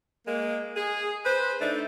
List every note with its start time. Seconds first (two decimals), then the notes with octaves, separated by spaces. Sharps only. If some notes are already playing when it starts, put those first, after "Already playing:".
0.27 G#3 A#3
0.76 G#4
1.26 B4 C5
1.61 A3 D4 D#4